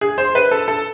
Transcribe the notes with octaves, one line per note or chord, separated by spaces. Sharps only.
G#4
C5
B4
A4
A4